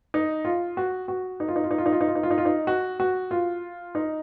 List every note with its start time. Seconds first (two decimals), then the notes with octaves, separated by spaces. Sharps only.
0.14 D#4
0.45 F4
0.77 F#4
1.08 F#4
1.40 D#4
1.48 F4
1.56 D#4
1.64 F4
1.71 D#4
1.78 F4
1.86 D#4
1.92 F4
2.01 D#4
2.08 F4
2.15 D#4
2.23 F4
2.30 D#4
2.38 F4
2.45 D#4
2.67 F#4
3.00 F#4
3.31 F4
3.95 D#4